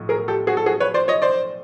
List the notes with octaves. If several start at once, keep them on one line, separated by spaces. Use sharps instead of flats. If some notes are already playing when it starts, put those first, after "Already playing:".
Already playing: B1 A2 F3
G#4 A#4
G4 A4
F#4 G#4
A4
F#4 G#4
B4 C#5
C5 D5
C#5 D#5
C5 D5